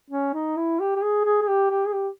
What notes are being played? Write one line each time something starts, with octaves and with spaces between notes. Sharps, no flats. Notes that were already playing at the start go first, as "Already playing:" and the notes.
C#4
D#4
E4
G4
G4
G#4
G#4
G#4
G4
G4
G#4
G4